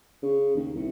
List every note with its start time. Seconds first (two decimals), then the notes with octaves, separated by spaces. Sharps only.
0.23 C#3
0.56 D#2
0.75 C2